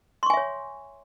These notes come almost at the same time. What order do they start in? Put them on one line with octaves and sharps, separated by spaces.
C6 C#6 G#5 E5 C#5